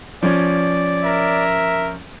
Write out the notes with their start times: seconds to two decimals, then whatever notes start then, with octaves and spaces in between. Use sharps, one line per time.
0.23 F3 C#4 D5
1.03 A#4 E5